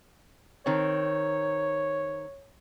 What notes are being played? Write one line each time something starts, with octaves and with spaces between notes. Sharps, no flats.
D#3 C4 C#5